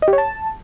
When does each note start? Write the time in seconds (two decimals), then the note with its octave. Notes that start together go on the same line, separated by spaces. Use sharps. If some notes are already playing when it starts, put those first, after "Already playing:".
0.02 D#5
0.08 G4
0.13 C#5
0.18 A5